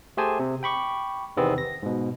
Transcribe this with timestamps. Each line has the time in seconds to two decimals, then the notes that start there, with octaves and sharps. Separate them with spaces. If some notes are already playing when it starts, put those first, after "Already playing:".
0.17 A3 G4 G#4 C5 G#5 A5
0.39 C3
0.63 G5 B5 C#6 D6
1.37 E2 C3 D#3 E3 B3 C4
1.58 A#6
1.83 G#2 B2